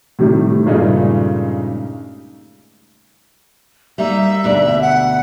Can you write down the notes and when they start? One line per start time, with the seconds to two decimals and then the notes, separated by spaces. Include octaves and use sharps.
0.19 A2 C3 D#3 G3 A3
0.66 G2 A#2 C#3 G#3 A3 D#4
3.98 G3 A#3 D#4 E5
4.44 D2 B2 D5
4.81 F#5